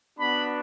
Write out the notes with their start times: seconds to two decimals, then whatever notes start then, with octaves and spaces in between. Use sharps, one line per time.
0.18 B3 D4 F#4 B5